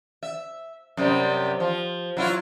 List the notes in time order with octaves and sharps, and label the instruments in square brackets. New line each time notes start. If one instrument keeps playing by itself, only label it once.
[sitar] E5
F#2 C3 G3
F3
F#3 E4 F4